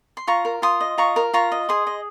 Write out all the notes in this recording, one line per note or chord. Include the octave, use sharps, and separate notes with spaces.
C6
F4 A#5 C#6
A#4
F4 C6 D#6
D#5
F4 A#5 C#6
A#4
F4 A#5 C#6
D#5
G#4 C6 D#6
D#5